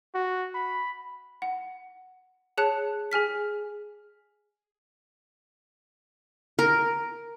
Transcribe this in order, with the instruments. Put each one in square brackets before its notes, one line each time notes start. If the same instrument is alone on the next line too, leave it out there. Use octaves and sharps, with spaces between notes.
[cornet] F#4
B5
[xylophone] F#5
G#4 C#5 A5 F#6 C#7
G#4 G#5 F6 B6
[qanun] A#4